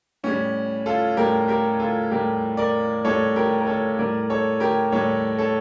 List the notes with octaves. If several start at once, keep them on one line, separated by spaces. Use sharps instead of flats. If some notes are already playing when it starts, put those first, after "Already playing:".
A2 G3 C#4
F4 A4
A2 G3 G4 A#4
G4 A#4
F4 A4
A2 G3 G4 A#4
A#4 D5
A2 G3 A4 C#5
G4 A#4
A#4
A4 C#5
A2 G3 A#4 D5
A4 C#5
G4 A#4
A2 G3 A4 C#5
A4 C#5